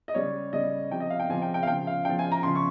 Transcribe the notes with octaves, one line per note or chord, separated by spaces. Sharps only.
D#5
C#3 G3 C#5
C#3 G3 D#5
C3 F3 G5
D#5
F5
G5
C3 F3 G#5
G5
G5
F5
C#3 F3 G5
F5
C#3 F3 G5
G#5
A#5
C#3 F3 C6
C#6